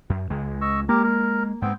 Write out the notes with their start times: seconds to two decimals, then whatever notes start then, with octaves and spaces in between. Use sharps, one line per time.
0.10 F#2
0.30 C#2 G#3
0.61 D#5 C#6 E6
0.89 G#3 A#3 G4 A#4
1.04 A#4
1.62 G#2 G#3 B3 C4 G5